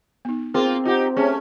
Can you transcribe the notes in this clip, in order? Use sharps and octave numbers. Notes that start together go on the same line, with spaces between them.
B3 D#4
A#3 C4 F4 G#4 A#4
D#4 F4 G4 F#5
A3 C#4 G#4 C#5